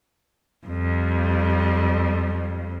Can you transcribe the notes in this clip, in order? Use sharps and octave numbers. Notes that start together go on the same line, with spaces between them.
F2 G3